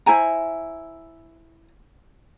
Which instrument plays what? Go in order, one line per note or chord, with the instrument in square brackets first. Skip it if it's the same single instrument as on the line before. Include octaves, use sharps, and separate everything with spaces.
[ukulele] E4 C5 G#5 A#5